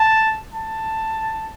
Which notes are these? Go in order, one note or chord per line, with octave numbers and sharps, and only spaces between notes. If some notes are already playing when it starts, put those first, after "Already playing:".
Already playing: A5
A5